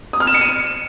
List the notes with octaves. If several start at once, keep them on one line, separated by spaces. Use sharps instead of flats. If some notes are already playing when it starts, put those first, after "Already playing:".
D#6
F6
E7
C#7
D#7